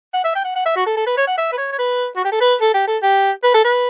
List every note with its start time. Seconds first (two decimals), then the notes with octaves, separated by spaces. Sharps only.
0.14 F#5
0.24 E5
0.35 G5
0.44 F#5
0.55 F#5
0.65 E5
0.76 F#4
0.86 A4
0.97 A4
1.07 B4
1.17 C#5
1.27 F#5
1.38 E5
1.52 B4
1.57 C#5
1.71 C#5
1.79 B4
2.16 F#4
2.24 G4
2.32 A4
2.40 B4
2.61 A4
2.74 G4
2.87 A4
3.02 G4
3.43 B4
3.54 A4
3.64 B4